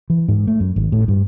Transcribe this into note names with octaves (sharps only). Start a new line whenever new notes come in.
E3
G#2
A3
F#2
G#1
A2
G2